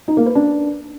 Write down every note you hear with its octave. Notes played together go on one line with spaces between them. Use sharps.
D#4
A#3
B4
D4